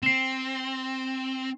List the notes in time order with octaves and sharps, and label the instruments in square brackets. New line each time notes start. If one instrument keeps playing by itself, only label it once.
[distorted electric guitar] C4 [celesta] C7 E7